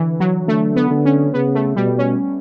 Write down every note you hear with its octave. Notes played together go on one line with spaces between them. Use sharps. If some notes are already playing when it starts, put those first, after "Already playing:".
Already playing: D3 E3
F#3
D3 A3
B3
D3
C#4
C#3 B3
A3
B2 G3
C#4